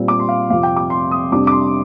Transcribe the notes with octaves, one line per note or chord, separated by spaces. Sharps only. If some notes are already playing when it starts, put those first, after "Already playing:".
Already playing: A#2 G3 C4
D6
C6
F5
F2 C3 F3 F5
G5
D6
C6
D#6
F2 C3 G3 D4 D6
D6
C6